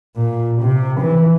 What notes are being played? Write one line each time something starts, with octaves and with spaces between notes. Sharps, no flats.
A#2
C3
E3